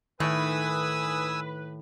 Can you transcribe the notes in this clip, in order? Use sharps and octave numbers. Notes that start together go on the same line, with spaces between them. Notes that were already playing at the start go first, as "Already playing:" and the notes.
A2 D#3 B4 E5 G#5 D#6 E6